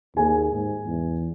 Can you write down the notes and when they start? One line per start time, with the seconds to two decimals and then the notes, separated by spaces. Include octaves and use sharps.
0.17 D#2 G#4 G#5
0.52 G#2
0.86 E2